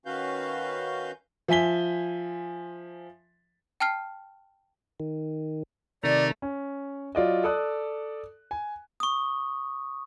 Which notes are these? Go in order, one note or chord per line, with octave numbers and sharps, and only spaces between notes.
D#3 C#4 F#4 B4 F5 G6
F3 E5 G#5 B6 G7
G5 A5 F6 C7
D#3
C3 D#3 A3 D5 A#5
C#4
F#3 F4 D5 D#5
A4 D5 D#6 F#6
G#5
C#6 D#6